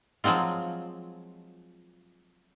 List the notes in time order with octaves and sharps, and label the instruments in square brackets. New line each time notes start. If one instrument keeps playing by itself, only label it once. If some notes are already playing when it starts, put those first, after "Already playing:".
[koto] F3 F#3 G#3 C4 F4